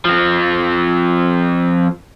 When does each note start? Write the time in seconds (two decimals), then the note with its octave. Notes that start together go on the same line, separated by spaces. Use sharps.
0.05 F3 C4